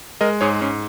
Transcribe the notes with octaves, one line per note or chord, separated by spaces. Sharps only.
G#3 A#4 D#5
G#2 G#4 C#5
G#2 C#4